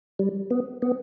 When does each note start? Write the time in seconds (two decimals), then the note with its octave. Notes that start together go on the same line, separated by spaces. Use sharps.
0.19 G3
0.51 B3
0.82 B3